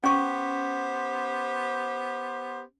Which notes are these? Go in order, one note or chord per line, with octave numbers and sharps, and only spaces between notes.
B3 C#4 G4 C5 C#6